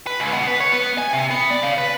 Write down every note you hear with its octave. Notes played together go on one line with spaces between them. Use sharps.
B4
C#2
B2
B4
C#5
B3
G#5
C3
B3
D5
C#3
B4